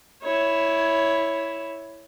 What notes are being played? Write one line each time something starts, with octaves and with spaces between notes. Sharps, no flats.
E4 C#5